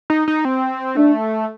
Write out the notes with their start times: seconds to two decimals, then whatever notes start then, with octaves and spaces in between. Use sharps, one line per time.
0.10 D#4
0.28 D#4
0.45 C4
0.96 A3 D4